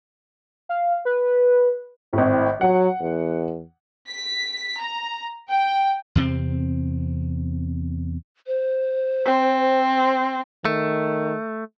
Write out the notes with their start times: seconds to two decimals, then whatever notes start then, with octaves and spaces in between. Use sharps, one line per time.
0.69 F5
1.05 B4
2.13 G#1 A2 C4
2.61 F#3 F#5
3.01 E2
4.09 B6
4.81 A#5
5.48 G5
6.15 E2 C3 A3 C4
8.46 C5
9.25 C4
10.65 D#3 A3